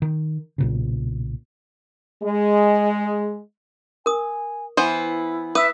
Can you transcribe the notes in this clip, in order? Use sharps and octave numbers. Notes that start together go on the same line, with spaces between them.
D#3
B1 A#2 C#3
G#3
A#4 G#5 D#6
E3 B3 E4 C5
B4 E5 D#6 E6